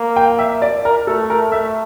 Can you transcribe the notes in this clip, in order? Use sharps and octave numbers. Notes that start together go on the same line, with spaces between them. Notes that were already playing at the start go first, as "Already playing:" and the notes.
Already playing: A#3
G5
E5
D5
A#4
A3 A4
A#4
A3 E5